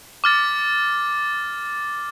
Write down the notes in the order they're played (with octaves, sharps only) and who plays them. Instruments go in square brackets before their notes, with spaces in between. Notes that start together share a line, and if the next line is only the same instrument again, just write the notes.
[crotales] D6 F6 A6